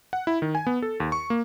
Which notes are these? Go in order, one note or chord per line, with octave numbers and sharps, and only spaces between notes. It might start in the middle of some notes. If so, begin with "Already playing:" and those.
F#5
E4
D#3
G#5
B3
A4
D#2
C#6
A#3